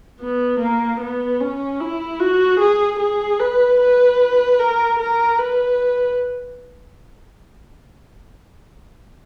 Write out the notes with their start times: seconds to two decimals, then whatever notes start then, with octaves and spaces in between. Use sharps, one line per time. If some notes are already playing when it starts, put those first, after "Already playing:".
0.21 B3
0.60 A#3
1.00 B3
1.40 C#4
1.80 E4
2.20 F#4
2.60 G#4
3.00 G#4
3.40 B4
3.80 B4
4.59 A#4
4.99 A#4
5.39 B4